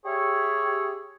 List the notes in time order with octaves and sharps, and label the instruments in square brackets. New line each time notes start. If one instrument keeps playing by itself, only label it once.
[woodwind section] G4 G#4 C#5 E5